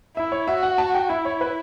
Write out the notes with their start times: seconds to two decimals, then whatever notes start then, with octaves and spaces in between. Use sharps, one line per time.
0.17 E4 E5
0.32 C#5
0.48 F#4 E5
0.63 F#5
0.78 A5
0.95 G5
1.09 E4 E5
1.25 C#5
1.41 B4